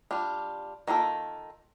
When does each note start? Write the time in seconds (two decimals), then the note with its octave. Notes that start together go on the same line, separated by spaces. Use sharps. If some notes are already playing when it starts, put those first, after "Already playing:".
0.11 G3 D4 F4
0.88 D#3 A#3 F4 A4